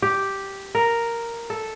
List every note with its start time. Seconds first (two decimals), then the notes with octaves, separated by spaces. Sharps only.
0.02 G4
0.75 A#4
1.50 A4